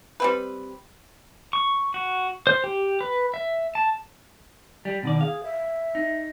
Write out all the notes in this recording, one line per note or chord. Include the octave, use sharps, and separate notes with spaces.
G3 C4 B4
C#6
F#4
C5
G4
B4
E5
A5
G3
B2 D#3 D5
G#4 F5
E5
D#4